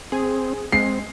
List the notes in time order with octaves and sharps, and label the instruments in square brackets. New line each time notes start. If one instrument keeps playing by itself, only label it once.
[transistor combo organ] C4 [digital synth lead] G#4
[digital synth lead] G#3 [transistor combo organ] C4 [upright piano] C7